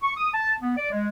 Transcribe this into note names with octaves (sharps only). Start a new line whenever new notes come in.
C#6
D#6
A5
B3
D5
G#3